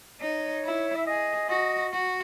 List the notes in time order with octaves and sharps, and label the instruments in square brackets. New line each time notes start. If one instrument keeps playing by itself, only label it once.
[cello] D#4 [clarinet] C#5
[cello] E4
[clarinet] E5
[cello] G#4 [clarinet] D#5
[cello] F#4 [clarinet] D#5
[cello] F#4